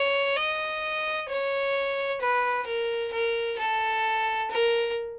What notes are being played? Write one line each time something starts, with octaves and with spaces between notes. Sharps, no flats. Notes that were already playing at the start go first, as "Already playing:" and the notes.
Already playing: C#5
D#5
C#5
B4
A#4
A#4
A4
A#4